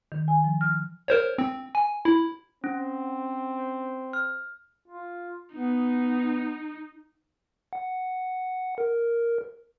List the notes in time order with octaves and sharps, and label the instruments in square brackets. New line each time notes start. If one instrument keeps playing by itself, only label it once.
[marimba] D#3
G#5
F3
F6
[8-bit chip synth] A#4 C5 C#5
C4
G#5
E4
[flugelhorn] C4 [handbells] C#4
[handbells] F6
[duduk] F4
[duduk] B3 [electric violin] D#4
[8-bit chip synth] F#5
A#4